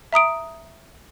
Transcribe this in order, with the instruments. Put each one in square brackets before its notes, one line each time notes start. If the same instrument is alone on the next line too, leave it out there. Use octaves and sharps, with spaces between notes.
[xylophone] E5 A#5 D#6 D7